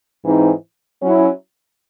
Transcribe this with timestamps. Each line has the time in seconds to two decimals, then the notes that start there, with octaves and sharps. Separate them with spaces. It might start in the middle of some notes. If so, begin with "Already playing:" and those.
0.24 G#2 E3 C4 D#4
1.01 F#3 C#4 E4